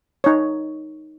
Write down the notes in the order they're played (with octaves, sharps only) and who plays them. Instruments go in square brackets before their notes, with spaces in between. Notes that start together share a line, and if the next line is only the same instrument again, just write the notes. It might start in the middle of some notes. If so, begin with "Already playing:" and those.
[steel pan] D#4 C#5